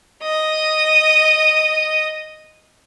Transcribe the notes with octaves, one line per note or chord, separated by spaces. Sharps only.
D#5 D#6